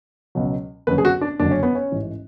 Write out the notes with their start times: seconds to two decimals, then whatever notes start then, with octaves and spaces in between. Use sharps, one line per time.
0.35 C#2 B2 F#3
0.87 F#1 F#2 D3 F#3 B4
0.98 G#4
1.05 F#4
1.21 D4
1.39 F#1 F#2 D3 F#3 D4
1.51 C#4
1.63 B3
1.75 C#4
1.92 A1 G#2 E3